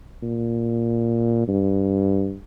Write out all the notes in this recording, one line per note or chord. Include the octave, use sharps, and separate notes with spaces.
A#2
G2